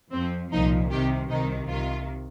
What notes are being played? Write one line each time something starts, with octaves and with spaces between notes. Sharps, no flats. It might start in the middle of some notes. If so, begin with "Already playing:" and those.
F2 F3 C4
C2 A#2 F3 D#4
C2 C3 D#3 G4
C2 C3 D#3 D#4
C2 C3 D#3 F4